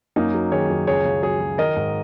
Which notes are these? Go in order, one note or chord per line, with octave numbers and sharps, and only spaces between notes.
F#2 A#3 D#4
F#3
D#3 G#4 C#5
F#2
C#2 G#4 C#5
C#3
F#3 G#4 C#5
F#3
D#3 A#4 D#5
G#2